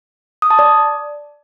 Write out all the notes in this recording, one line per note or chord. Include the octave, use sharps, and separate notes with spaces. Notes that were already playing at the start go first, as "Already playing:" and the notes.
D#6
A5
D5